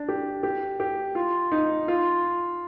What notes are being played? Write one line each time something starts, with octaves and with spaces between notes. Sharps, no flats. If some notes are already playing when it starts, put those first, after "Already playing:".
Already playing: D4
G4
G4
G4
F4
D#4
F4